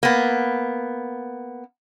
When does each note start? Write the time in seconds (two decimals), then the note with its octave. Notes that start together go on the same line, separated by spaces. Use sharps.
0.03 A#3 B3